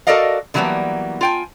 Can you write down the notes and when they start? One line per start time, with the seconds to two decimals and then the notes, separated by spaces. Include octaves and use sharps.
0.07 F#4 A4 A#4 D5 D#5 F5
0.54 D3 E3 F#3 G3 A#3 B3
1.21 F4 G5 G#5